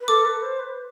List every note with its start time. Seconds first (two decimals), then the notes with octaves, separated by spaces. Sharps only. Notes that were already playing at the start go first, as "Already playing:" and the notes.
0.01 B4
0.08 A4 D6
0.25 B4
0.42 C5
0.59 B4